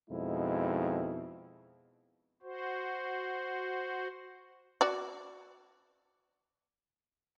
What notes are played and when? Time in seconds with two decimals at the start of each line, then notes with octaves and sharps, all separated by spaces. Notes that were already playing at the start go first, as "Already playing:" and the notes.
0.10 F2 B2 G#3 D#4 E4
2.43 F#4 C5
4.81 F#4 D5